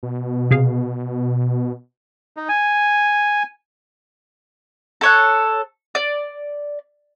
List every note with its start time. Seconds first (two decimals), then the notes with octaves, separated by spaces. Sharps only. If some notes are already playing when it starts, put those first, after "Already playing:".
0.03 B2
0.51 C3 G#4 F5
2.37 D#4
2.49 G#5
5.01 A4 C#5 F#6
5.95 D5